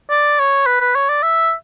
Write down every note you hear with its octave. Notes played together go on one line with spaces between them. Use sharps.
D5
C#5
B4
B4
C#5
D5
E5